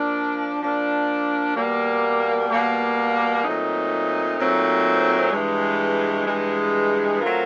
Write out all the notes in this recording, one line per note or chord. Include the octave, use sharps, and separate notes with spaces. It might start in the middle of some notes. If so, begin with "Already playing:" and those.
Already playing: F3 A#3 D4
F3 A#3 D4
B2 G3 A#3
B2 G3 A#3
A#2 F#3 A3 C4 D#4
A#2 F#3 A3 C4 D#4
G2 E3 G#3
G2 E3 G#3
F#3 A3 C4 F4 A#4